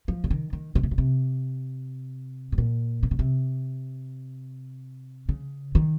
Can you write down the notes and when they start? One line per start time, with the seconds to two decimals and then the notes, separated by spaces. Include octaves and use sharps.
0.08 F3
0.24 C#3
0.31 D#3
0.53 D#3
0.75 C#3
0.83 C3
0.91 A#2
0.98 C3
2.52 A2
2.58 A#2
3.03 C3
3.11 C#3
3.19 C3
5.29 C#3
5.75 D#3